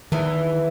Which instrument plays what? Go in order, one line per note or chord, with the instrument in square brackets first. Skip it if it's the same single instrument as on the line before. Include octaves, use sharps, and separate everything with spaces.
[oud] E2 E3 [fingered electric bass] D#3